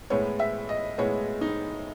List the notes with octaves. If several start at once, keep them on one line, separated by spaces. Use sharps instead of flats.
A2 G#3 B3 C#5
E5
D#5
A2 G#3 B3 C#5
D#4